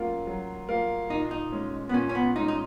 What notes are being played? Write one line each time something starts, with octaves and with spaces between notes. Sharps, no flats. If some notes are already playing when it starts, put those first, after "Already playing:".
Already playing: F#3 A#3 C#4 F4 A#4 F5
F#3
A#3 F4 A#4 F5
A#2 D#4
D#4
G#3 C#4
B3
A#2 C#4
C#4
B3
G#3 C#4 D#4
D#4